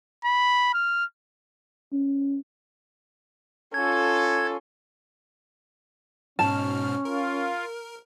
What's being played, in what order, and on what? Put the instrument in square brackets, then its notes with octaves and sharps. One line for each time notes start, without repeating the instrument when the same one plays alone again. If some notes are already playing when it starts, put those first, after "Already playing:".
[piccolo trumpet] B5
F6
[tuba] C#4
[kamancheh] C#4 F4 [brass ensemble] A4 [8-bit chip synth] G#6
[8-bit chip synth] G#2 B2 F6 [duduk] C#4 [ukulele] A5
[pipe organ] F4 [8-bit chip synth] A#4